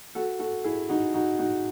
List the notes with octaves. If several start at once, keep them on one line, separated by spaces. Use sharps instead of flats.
F#4 A4
F#4 A4
E4 G#4
D#4 F#4
D#4 F#4
D#4 F#4